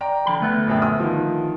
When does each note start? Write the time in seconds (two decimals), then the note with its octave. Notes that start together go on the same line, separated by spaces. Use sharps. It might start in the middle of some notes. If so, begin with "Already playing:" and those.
0.01 D5 G5 A#5
0.26 D3 F3 B5
0.41 D2 A3 B3
0.67 A#1 F#2 G5
0.82 D#6
1.00 D#3 F3